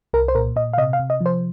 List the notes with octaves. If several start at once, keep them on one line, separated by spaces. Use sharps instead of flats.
C2 A#4
C5
A#2 A#4
A#2 D#5
F5
C3 D#5
F5
C3
D#5
F3
C5